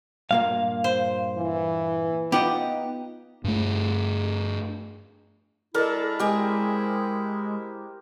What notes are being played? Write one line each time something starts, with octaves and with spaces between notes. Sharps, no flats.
G2 A#2 A#3 F5
C5
E3
B3 D#4 F4 G4 D#5 F#5
G2 A3
G#3 D4 E4 A4 A#4
G#3 C4 G4 G#4